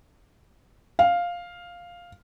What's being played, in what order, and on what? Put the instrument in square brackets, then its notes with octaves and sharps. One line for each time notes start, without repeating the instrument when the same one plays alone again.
[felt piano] F5